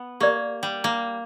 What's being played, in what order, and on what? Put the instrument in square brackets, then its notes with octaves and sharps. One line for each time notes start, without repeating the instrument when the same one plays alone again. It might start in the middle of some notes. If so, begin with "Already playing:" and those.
Already playing: [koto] B3
[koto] A#3 [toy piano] G4 A#4 D5
[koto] G3
A#3